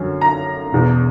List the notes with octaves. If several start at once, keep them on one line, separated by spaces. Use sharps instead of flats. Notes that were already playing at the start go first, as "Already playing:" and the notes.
Already playing: F#2 D3 F#3 C#4
A#5
E1 E2 B2